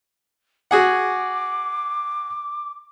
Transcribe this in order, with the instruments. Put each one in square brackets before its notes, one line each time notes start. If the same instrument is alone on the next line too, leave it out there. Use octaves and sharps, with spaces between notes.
[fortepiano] F#4 G#4 F#5 [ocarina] D6